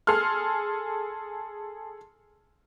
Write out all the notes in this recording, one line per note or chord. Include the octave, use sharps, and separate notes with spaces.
G#4 A4 C6 F6